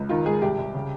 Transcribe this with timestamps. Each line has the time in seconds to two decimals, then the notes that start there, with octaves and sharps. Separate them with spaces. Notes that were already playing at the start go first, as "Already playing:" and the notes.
Already playing: C#2
0.09 D#3 F4
0.26 G#2 G#4
0.42 C2 G4
0.58 C2
0.74 C#3